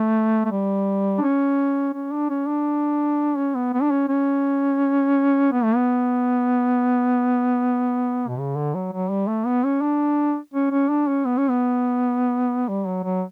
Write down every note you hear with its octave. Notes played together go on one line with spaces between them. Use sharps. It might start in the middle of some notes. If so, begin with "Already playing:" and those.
Already playing: A3
A3
G3
D4
C#4
C#4
D4
C#4
D4
C#4
B3
B3
D4
C#4
C#4
B3
A3
B3
B2
C#3
D3
F#3
F#3
G3
A3
B3
C#4
D4
C#4
C#4
D4
C#4
B3
C#4
B3
G3
F#3
F#3